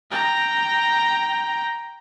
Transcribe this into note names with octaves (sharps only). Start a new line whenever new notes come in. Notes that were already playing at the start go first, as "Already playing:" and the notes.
G5 A#5